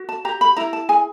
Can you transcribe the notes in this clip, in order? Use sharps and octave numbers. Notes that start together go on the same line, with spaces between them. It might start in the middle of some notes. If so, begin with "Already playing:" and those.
Already playing: F#4
A5
G4 A#5
B5
E4 A#5
A5
G#4 G#5